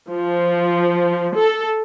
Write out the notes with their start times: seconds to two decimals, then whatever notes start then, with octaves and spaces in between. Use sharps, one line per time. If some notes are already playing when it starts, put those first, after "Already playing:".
0.10 F3
1.34 A4